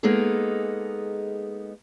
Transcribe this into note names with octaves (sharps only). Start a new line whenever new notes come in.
G#3 A#3 B3 D#4 G#4 A4